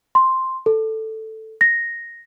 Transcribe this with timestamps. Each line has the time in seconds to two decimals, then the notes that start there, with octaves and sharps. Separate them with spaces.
0.15 C6
0.66 A4
1.61 A#6